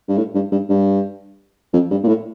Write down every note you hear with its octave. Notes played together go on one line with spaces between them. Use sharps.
G2
A2
G2
G2
G2
F2
G2
A#2
A2